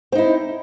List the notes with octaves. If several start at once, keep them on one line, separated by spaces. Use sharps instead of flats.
C4 D#4 E4